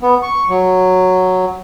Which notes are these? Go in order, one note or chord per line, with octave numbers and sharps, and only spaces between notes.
B3
C#6
F#3